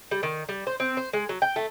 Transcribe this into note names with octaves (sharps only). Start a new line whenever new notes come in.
G3
D#3
G3
C5
C4
C5
G#3
F#3
G5
A3